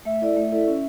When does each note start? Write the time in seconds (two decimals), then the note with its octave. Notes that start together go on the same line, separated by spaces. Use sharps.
0.05 A3 E5
0.22 E4 A4 D5
0.37 A3
0.52 E4 A4 D5
0.67 C#4